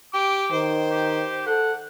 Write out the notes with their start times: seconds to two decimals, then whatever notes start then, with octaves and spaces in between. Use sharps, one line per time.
0.13 G4 D6
0.52 D#3 C5
0.91 G4
1.46 A4 F#5